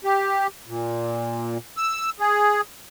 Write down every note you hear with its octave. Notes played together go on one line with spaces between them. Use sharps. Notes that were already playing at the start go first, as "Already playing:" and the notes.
G4
A#2
E6
G#4